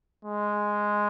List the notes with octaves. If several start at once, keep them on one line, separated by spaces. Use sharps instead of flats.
G#3